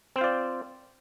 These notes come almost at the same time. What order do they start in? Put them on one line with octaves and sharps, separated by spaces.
C4 C5 F4 D5